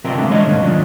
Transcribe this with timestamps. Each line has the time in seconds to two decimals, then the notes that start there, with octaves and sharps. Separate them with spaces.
0.04 D2 C3 F3 C4 G4 A#4
0.17 F3 G#3 A3 D4 E4
0.29 D3 E3 G#3 A#3 C#5 D#5
0.46 C2 G#2 D3 D#3 A#3
0.61 D#2 D#3 F3 F#3 C#4 D4